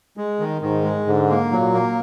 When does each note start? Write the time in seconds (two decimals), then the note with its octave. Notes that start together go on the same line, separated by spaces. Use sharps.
0.17 G#3
0.40 D#3
0.62 G#2 D#3
0.84 G#3
1.07 G#2 D3
1.30 A#3
1.52 A#2 F#3
1.74 A#3